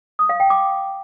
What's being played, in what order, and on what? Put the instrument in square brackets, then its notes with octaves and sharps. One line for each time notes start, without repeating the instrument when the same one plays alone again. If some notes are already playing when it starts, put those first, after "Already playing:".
[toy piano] D#6
F5
G5
D6